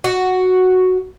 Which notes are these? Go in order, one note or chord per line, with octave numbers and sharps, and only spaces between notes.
F#4